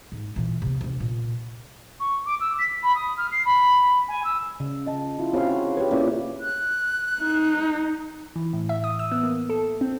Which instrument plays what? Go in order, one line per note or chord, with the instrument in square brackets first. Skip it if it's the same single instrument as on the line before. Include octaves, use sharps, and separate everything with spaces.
[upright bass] G#2
A#2 E3
C3 A#3
D2 C3
A#2
[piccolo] C#6
D6
E6
B6
B5
D#6
F6
C7
B5
G#5
E6
[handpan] C#3
[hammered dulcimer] D#5 A5
[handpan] E4 F4
[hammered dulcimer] C#3 [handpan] C4 F#4 F5
[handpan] G4 B4 [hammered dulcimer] C#5
[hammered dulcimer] A#2 [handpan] C#4 E4
[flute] F#6
[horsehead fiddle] D#4
[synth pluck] E3
A2
E5
D#6
E6
B3
A#3
A4
C4